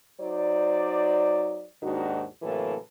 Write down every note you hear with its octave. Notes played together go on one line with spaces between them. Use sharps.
F#3 D#4 C5 D5
D#2 G#2 D#3 D4 F#4
A2 C3 E3 F#3 A#3 A4